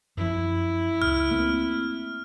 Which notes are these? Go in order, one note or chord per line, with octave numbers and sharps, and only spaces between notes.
F#2 F3 E4
D#1 C#2 F6
A3 A#3 C4